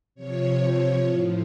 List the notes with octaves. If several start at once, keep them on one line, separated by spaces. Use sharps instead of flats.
C3 F3 C#5
A2 F3